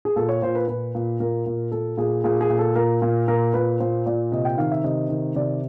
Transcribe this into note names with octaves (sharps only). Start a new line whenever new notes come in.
G#4
A#2 A4
C#5
A#2 C5
B4
A#2 B4
A#2
A#2 A#4
A#2
A#2 A4
A#2 G#4
A#2 G#4
G#4
A#2
A4
A#2 A#4
A#2
A#2 A#4
A#2 B4
A#2 C5
A#2 D5
C3 D#5
G5
D#3 F5
E5
C3 D#5
D#3
C3 D5